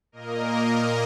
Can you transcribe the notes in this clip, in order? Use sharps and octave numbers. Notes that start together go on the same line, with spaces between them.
A#2 A#3 A#4 D#5